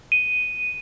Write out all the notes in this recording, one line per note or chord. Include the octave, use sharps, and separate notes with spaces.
D#7